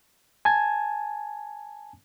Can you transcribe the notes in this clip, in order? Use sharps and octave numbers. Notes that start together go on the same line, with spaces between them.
G#5 A5 G#6